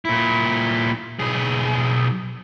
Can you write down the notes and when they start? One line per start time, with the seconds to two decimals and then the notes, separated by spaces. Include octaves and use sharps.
0.05 A#2 E4
1.19 B1 G#4